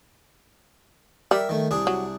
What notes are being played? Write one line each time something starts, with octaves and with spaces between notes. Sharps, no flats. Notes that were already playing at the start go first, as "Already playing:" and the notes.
G3 A#4 E5
D#3 A3
C2 D4 G#4
F#3